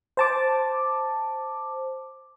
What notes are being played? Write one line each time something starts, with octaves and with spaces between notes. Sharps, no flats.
C5 A5 D6